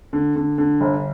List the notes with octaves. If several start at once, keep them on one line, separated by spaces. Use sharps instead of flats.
D3
D3
D3
G1